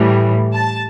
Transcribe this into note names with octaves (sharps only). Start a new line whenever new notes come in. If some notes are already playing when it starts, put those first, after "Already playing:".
Already playing: A2 E3 G3
A5